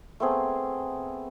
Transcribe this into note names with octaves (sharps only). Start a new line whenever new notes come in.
A3 B3 C4 G#4